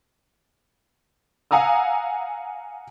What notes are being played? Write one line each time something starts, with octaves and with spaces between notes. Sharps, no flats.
F5 F#5 G#5 A#5 D#6 E6